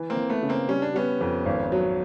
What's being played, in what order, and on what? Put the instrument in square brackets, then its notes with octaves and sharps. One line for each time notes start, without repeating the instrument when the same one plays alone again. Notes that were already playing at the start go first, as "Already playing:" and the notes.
Already playing: [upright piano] E3
[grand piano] A#3 C4
[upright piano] E3
[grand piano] A3 B3
[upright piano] C#3
[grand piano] A#3 C4
[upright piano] G3 [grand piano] C#4
[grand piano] D4
[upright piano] G3 [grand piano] B3 C#4
[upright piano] F2
G#1
F#3